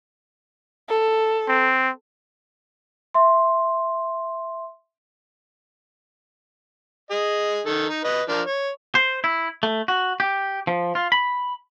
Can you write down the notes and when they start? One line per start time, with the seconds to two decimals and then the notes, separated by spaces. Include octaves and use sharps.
0.88 A4
1.48 C4
3.14 E5 C6
7.11 G#4 D#5
7.66 D#3 A4
7.90 D#4
8.04 B4 D#5
8.29 F3 D4 A#4
8.46 C#5
8.95 C5
9.24 E4
9.63 A3
9.88 F#4
10.20 G4
10.67 F3
10.95 F4
11.12 B5